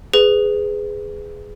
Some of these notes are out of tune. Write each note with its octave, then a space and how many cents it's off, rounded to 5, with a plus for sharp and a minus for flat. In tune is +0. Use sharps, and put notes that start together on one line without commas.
G#4 +0 B4 +20